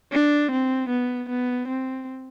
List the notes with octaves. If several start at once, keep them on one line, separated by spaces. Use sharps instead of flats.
D4
C4
B3
B3
C4